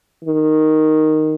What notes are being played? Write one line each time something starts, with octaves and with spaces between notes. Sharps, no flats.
D#3